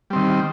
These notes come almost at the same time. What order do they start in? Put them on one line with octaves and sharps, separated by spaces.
G3 C4 D#3